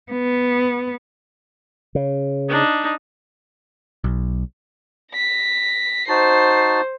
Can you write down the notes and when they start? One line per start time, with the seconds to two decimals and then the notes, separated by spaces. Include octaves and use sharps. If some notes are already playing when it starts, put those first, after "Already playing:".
0.12 B3
1.95 C#3
2.49 D4 D#4
4.04 B1
5.14 A#6 B6
6.09 D#4 F#4 C5 A5 C7